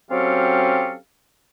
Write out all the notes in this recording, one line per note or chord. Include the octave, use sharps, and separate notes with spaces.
F#3 C4 C#4 G4 A4 F5